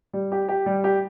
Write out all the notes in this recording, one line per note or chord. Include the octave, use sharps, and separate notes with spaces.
G3
G4
G4
G3
G4